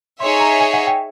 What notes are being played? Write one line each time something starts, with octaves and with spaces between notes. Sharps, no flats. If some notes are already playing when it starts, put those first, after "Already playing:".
D#4 G#4 C#5 E5 C6
A#5
G#5
F#5
G5